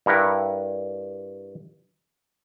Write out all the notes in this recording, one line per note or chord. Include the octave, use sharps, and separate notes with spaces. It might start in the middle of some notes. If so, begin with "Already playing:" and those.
G2 E4 A#4 F#5